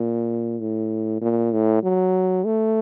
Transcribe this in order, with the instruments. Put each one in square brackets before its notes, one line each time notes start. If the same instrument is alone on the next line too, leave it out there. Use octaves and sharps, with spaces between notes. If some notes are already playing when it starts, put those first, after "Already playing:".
Already playing: [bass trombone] A#2
A2
A#2
A2
F#3
A3